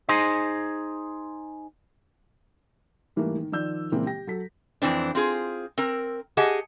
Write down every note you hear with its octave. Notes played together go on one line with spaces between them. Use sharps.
D#4 G#4 C5 D#5
G#2 E3 G3 A3 A#3
D#3
D#3 F3 D5 E6 G6
A#2 C#3 E3 G#3 A#3 C4
G4 G5 A#6
F#3 A4 B6
F2 E3 C4 D4
C4 F4 G#4
C4 A#4
G4 G#4 D#5 F#5 G#5 A5